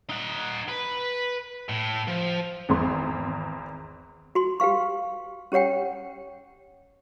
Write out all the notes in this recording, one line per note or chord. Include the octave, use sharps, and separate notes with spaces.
D#4 F#5
B4
A2
F3
G#1 E2 C6
F#4 C6
G4 B4 F5 C#6
C#4 G4 C#5 F#5 G5